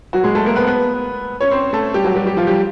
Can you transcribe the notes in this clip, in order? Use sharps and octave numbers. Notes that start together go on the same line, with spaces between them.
F#3 F#4
G#3 G#4
A3 A4
A#3 A#4
B3 B4
B3 B4
C#4 C#5
C4 C5
A3 A4
G3 G4
F#3 F#4
G3 G4
G3 G4
F3 F4
G3 G4